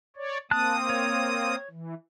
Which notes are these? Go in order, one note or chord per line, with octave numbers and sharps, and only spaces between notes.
C#5 D5
A#3 C4 A5 D#6 F#6
C#5
E3